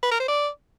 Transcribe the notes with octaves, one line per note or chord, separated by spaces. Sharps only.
B4
A#4
C5
D5